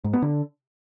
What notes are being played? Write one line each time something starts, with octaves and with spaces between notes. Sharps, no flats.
G#2
B3
D3